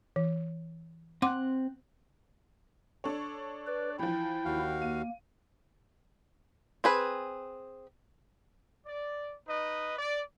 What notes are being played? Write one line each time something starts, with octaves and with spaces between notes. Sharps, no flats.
E3
C4 F#5 C6 D6 F#6
D4 A4 C#5
B4 D5
E3 F3 E4 G5
D#2 F#4 F5
A#3 D#7
C4 G#4 B4
D5
D#4 B4 D#5
D5